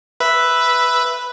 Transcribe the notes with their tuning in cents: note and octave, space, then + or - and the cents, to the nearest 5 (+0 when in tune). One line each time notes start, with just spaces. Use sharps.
B4 +0 E5 +0